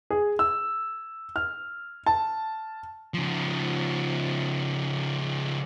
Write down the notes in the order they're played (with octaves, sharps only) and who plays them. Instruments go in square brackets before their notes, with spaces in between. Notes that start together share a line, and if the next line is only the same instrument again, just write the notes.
[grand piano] G#4
E6
F6
A5
[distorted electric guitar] C#3 F3